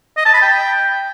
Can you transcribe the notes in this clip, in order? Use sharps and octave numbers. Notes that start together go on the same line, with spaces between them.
D#5
A5
B5
G5